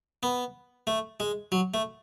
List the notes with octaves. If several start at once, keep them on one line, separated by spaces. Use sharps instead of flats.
B3
A3
G#3
F#3
A3